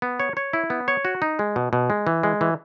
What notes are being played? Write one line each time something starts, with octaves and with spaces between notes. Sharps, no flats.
B3
C#5
C#5
E4
B3
C#5
F#4
D#4
G#3
B2
B2
G#3
E3
G#3
E3